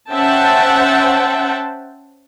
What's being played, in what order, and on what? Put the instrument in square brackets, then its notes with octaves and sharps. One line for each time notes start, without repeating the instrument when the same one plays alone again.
[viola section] C#4 C5 E5 F#5 G5 A5